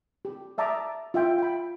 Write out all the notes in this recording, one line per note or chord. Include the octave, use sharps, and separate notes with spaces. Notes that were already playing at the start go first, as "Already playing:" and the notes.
G4
D5 E5 A5 A#5 D6 D#6
F4 E5 G5
G5 B5